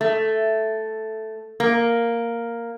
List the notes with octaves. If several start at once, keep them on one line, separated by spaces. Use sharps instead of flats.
A3
A#3